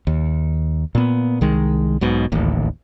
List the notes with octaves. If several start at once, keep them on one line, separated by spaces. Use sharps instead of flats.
D#2
A#2 B3
C2 D#3 G#3
B1 G#2 B2
D1 A1 D#2